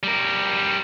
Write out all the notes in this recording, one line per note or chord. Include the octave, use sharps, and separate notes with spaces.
G3 A#4